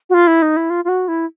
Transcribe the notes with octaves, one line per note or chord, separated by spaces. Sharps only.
F#4
F4
E4
D#4
E4
F4
F4
F#4
E4